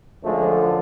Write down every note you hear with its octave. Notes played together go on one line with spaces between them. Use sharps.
F#2 D3 F3 G#3 A3